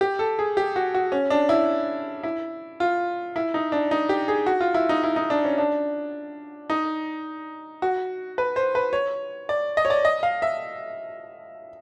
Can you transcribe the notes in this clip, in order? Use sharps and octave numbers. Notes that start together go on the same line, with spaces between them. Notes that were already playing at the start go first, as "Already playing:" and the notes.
G4
A4
G#4
G4
F#4
F#4
C#4
D4
E4
E4
F4
E4
D#4
D4
D#4
G4
G#4
F#4
F4
E4
D#4
E4
D#4
D4
C#4
D4
D#4
F#4
B4
C5
B4
C#5
D5
D#5
C#5
D5
D#5
F5
E5